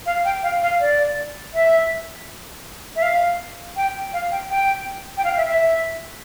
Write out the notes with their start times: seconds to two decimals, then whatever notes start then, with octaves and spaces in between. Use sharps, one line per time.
0.06 F5
0.25 G5
0.43 F5
0.62 F5
0.80 D5
1.54 E5
2.96 E5
3.02 F5
3.76 G5
4.13 F5
4.31 G5
4.50 G5
5.17 G5
5.24 F5
5.37 E5
5.49 E5